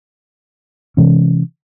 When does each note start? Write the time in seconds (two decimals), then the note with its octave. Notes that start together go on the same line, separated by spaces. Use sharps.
0.97 C3 E3 G#3 C#4